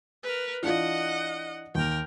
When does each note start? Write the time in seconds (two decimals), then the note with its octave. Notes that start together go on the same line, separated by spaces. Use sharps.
0.23 A#4 B4
0.63 E3 D4 F4 D#5 F#5
1.75 D#2 A#4 G5